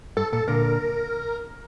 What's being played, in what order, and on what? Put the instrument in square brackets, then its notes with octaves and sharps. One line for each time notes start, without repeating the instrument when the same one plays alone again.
[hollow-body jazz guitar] G2 [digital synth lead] A4
[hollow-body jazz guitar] A#2 [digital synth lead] A4
[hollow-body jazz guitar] A#2 D3 [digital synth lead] A#4